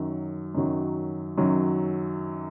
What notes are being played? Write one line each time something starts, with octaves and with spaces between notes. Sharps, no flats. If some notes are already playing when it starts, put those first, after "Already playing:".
Already playing: F#2 D#3 F#3
F#2 D#3 F#3
F#2 D#3 F#3